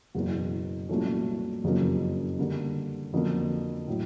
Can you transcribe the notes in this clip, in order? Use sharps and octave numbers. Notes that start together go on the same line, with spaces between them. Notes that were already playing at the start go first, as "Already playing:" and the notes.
F#1 E2 B2 F#3
C2 A#2 F#3 A3 C#4
F#1 F2 C#3 F#3 A#3
D3 G3 A#3
F2 D3 F#3 A#3
A2 F#3